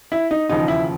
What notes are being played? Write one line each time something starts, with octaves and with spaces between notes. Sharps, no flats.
E4
D#4
E1 D#2 C#3 F3 D#4
E4